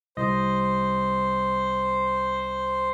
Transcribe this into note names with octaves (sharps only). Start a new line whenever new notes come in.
C2 C5 D#5